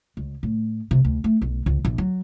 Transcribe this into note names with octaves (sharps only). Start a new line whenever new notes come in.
C#2
A2
C3
D2
A3
B1
C#2
A#1
F#3